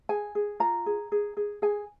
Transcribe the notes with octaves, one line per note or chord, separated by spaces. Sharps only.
G#4 G#5
G#4
F4 A#5
G#4
G#4
G#4
G#4 G#5